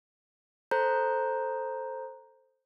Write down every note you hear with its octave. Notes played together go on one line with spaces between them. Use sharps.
A4 C5 A#5 G6